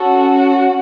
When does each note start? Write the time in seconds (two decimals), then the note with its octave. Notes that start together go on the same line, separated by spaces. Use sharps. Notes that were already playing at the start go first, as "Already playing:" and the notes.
Already playing: C#4 F#4 A4